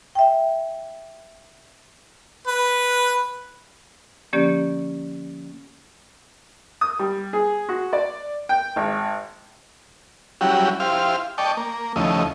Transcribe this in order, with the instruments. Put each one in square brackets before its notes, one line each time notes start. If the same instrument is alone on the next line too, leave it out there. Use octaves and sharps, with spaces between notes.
[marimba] E5 G5
[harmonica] B4
[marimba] D3 F3 A#3 C#4 G4 D5
[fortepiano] D#6
G3
G#4
F#4
D5
G5
G#1
[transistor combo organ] F#3 G3 C#4 E4 F#4 G4
E4 F4 G4 C5 F5
D5 D#5 G5 A5 C#6
A#3
D#2 C#3 F3 A3 E4 D#5